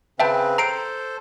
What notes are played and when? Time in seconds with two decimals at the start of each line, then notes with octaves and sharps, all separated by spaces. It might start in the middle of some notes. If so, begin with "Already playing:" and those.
0.20 C#3 C4 B4 E5 G5 A5
0.58 A4 C5 A#5 C7 D7